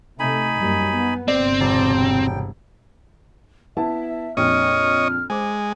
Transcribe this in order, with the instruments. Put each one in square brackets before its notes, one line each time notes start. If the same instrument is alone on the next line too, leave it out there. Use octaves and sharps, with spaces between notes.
[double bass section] C3 A3 [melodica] D#4 G#5 B5
[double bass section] F#2 G3 A#3
B3
[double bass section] G1 C3 [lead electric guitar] C4 [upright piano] D5
[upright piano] E1 [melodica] D5 A5
[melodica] G5
[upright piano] B3 E4 A5 [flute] E5
[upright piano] A#1 F2 [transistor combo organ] C#5 D#5 [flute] F6
[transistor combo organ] G#3 [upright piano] C5 D6